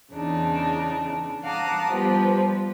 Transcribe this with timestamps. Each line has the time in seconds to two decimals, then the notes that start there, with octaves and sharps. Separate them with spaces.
0.13 E2 C#3 D4 D#4
1.44 F5 F#5 A5 A#5 D6 D#6
1.90 F3 G3 B3 G4 B4